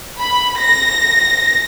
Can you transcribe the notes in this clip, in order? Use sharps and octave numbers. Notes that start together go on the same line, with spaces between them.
B5
A#6